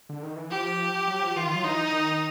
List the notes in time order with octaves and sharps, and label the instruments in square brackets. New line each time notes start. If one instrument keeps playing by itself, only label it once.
[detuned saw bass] D3
D#3
E3
[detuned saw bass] F3 [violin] G4
[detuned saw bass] F#3
F3
[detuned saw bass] E3 [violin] F4
[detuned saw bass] D#3
F#3
[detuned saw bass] E3 [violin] D#4
[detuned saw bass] D3
D#3